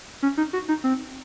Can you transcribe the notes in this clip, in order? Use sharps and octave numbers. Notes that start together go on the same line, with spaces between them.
C#4
D#4
F#4
D#4
C4